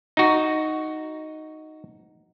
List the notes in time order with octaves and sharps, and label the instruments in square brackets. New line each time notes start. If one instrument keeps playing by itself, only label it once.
[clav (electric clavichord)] D#4 F#4